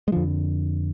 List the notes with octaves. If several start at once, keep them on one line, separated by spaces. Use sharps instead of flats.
G#3
F2 D3 F3